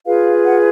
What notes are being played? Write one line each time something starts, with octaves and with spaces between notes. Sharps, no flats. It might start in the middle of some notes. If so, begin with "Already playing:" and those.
F4 G#4 B4 F5
F#5